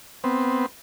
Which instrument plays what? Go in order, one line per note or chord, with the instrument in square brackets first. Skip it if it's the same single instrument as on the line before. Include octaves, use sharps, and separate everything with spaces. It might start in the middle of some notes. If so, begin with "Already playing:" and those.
[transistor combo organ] B3 C4